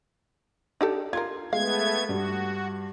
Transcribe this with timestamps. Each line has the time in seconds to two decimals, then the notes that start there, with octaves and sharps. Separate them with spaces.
0.81 D4 D#4 G4 A4
1.13 F4 A#4 C6 G#6
1.53 G#3 A3 B3 F5 G#6
2.09 G2 F#4